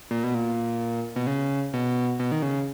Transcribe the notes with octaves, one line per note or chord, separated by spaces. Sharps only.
A#2
B2
A#2
B2
C#3
B2
B2
D#3
C#3